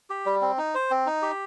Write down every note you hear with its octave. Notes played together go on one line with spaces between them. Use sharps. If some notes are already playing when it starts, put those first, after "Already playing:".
G4
G3
C4
D#4
C5
C4
D#4
G4